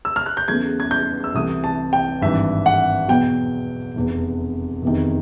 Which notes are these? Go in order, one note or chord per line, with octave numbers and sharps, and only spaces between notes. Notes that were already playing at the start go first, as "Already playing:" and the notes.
E6
F6
F#6
G6
E2 C#3 F#3 A3 G#6
G#6
G6
E6
C2 C3 E3 A3 D#6
A5
G5
G#1 G2 E3 E5
F#5
E2 B2 F#3 B3 G5
F1 E2 C3
F1 E2 C3 D#3